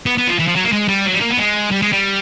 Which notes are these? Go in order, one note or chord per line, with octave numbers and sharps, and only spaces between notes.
B3
B3
F3
E3
F3
F#3
A#3
G#3
G3
F#3
G3
A#3
B3
G#3
G3
G#3
G3